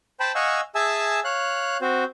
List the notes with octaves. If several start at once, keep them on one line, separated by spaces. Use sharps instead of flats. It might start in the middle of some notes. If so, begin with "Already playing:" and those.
C5 G5 A5 B5
D#5 F5 F#5 G#5 C#6 E6
G#4 E5 G#5 A5 E6
C#5 F5 F#6
C4 F#4 C5